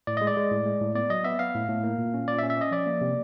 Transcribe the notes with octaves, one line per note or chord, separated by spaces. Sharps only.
A2 D5
G#3 D#5
D5
G#3
A2
G#3
A2
B3 D5
F#3 D#5
B3 E5
B3 F5
A2
A2
A#3
A#2
C#4
A#2 D5
E5
C#4
E5
C#4 D#5
F3 D5
A#3
C3